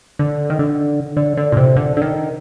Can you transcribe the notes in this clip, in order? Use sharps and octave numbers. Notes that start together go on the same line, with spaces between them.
D3
D#3
D3
D3
D3
A#2
C3
D3
D3
D#3